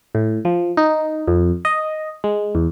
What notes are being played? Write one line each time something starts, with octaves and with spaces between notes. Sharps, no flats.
A2
F3
D#4
F2
D#5
G#3
E2